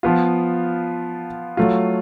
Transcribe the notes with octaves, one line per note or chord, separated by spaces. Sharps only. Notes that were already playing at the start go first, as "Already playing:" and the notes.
F3 B3 F4
F#3 A3 F4